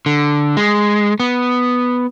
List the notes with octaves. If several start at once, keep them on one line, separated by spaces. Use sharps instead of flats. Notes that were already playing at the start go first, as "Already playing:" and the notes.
D3
G#3
B3